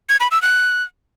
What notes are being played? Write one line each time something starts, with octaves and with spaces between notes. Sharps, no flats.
G#6
B5
E6
F#6